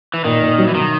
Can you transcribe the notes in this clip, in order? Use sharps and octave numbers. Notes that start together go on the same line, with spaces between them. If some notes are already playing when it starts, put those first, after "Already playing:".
E3
A#2 D#3
A#2
F#3
E3
B2 D#3